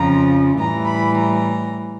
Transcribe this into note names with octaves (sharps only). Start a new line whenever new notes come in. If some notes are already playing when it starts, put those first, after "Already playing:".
Already playing: F2 C#3 F3 A#5
A2 E3 G3 A#5
B5
A#5